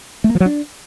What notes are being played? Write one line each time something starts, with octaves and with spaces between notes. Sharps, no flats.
A3
A#3
F3
F#3
D4